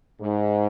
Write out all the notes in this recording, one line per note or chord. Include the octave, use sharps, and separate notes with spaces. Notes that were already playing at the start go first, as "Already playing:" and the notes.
G#2